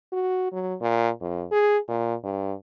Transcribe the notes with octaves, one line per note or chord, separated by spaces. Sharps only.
F#4
F#3
A#2
F2
G#4
A#2
G2